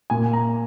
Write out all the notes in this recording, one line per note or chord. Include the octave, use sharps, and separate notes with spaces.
A#2 G#5
A#5